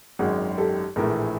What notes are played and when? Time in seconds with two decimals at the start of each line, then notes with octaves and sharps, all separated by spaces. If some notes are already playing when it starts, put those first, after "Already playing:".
0.19 G#1 F#2 D#3 F#4 G#4
0.58 G4 A4
0.96 A#1 A2 E3 A3 G#4 A#4